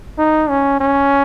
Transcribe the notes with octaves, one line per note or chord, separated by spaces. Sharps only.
D#4
C#4
C#4